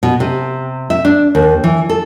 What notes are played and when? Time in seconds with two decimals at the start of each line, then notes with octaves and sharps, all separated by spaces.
0.03 B2
0.20 C3
0.90 E5
1.05 D4
1.35 D#2
1.64 E3
1.89 A4